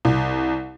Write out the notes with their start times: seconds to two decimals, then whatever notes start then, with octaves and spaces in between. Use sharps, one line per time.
0.05 C2